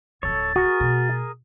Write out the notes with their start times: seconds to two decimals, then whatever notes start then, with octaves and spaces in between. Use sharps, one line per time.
0.23 D1 F3 A4 C#5 A6
0.56 F#4 G#4 A#4
0.80 B2 A3